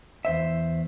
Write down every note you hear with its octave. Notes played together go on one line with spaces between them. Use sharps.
E2 C5 E5